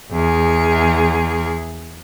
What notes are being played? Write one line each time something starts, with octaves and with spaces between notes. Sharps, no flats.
E2 G#4